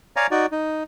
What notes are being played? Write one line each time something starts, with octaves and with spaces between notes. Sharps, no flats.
C#5 D5 F5 G#5 A#5
D#4 F#4 D5
D#4